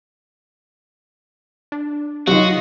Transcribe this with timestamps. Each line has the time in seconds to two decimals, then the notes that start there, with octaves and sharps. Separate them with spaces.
1.72 D4
2.27 C3 D#3 F#3 F4 F#4 D#5